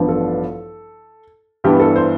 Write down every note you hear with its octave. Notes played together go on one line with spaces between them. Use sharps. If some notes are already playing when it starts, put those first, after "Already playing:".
Already playing: A1 G2 F3 B3 D4
A4
G2 E3 B3 D4 G4
A4
C5